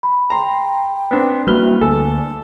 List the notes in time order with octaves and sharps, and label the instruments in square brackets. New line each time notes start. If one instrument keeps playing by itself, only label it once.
[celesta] B5
[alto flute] G5 [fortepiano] A#5 C6
[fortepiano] B3 C4 D4
[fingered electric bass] G3 G#3 A#3 [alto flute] E4 [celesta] F#4 G7 [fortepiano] B4 F6
[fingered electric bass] D2 [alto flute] D4 [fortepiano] A4 [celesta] G#5